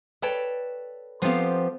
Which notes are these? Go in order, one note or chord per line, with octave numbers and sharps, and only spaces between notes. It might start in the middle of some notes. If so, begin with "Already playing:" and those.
A4 B4 C#5 D5 G5 A5
F3 B3 C4 G4 A4 F5